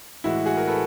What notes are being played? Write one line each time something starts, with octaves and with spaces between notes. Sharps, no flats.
A2 E3 G#3 E4 F#4
F#4 G#4
G#4 A#4
A4 B4